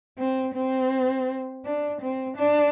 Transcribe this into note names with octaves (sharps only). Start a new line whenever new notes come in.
C4
C4
D4
C4
D4